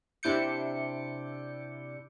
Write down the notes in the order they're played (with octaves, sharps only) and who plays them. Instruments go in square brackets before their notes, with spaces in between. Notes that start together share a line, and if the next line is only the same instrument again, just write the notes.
[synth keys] C3 D4 E4 D6 G6 C#7